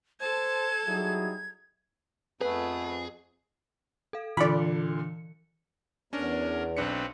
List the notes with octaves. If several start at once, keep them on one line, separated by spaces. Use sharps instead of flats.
A4 C5 A5 G#6
F#3 G3 D#4 E4 G#4
F2 A3 B3 G#4 B4
A4 F5
A#2 D3 E3 D5 B5 C#7
E2 C#4 D4 A#4
B1 C4 D4 B4 C#7